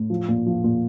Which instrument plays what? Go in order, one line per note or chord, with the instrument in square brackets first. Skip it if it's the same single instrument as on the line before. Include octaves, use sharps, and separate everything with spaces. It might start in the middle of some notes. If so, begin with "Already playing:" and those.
Already playing: [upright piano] A2
F3
A#2
F3
A#2